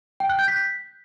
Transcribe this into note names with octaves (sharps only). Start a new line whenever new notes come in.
G5
F#6
G6
B6